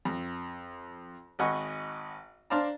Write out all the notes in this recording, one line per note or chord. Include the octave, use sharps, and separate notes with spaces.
F2
G#1 D#5 F#5 G#5 B5 C#6
D4 C5 D5 F5 A5 A#5